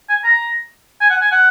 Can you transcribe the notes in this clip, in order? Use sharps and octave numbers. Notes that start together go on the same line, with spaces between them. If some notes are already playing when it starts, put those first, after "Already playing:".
G#5
A#5
G#5
F#5
G#5
F#5